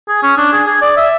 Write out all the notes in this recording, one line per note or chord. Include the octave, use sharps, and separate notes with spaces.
G#4
C#4
D4
G#4
G#4
D5
E5